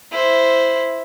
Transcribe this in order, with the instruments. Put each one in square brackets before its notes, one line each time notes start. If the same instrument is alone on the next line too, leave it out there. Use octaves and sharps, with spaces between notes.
[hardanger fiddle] E4 C5